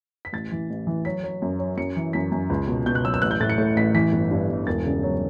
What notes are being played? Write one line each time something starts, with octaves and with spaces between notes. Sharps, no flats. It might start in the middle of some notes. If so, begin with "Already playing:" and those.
B6
A1 A6
E3
A1
E3
F#3 B6
F#3
F#2
F#3
F#2 C#7
E3
F#2 B6
F#2
C#2
B2
B2 G6
F#6
F#3 E6
E6
A1 F#6
G6
A2 A6
C#7
A2
A1 B6
E3 B6
G1
G2
G1
E1 A6
C#3
F#3